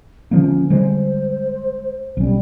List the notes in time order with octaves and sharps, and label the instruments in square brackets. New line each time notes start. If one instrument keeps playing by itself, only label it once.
[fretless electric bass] D3 F3 A#3 [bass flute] C#4
[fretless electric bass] D3 G3 G#3 [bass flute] C5
[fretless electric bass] B1 C#4 [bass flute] G3